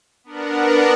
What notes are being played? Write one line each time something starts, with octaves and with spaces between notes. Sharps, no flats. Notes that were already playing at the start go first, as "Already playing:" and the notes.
B3 D4 A#4 F#5